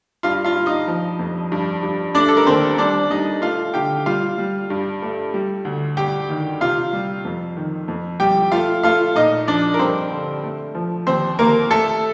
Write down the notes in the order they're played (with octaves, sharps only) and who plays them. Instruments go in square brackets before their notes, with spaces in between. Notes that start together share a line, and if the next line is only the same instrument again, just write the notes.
[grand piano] G2 F4 F5
F4 F5
G2
D#4 D#5
F3
F2
G2
G2
A3 D4 D5
A4
A#4
D#2 C4 C5
G3 D4 D5
G3 D#4 D#5
A3 F4 F5
D3 G4 G5
G3 F4 F5
G3
G2
A3
G3
D2
G2 G4 G5
D#3
C3 F4 F5
G3
F2
D#3
F2
G3 G4 G5
A3 F4 F5
A3 F4 F5
A#2 D#4 D#5
F3 D4 D5
A#4
G2 C4 C5
D3
A3
F3
D#2 C4 C5
D#2 A#3 A#4
A3 A4